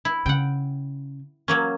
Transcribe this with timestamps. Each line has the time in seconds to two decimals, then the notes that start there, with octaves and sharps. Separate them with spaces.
0.05 E4
0.26 C#3 F#5 G5
1.48 F#3 A#3 C#4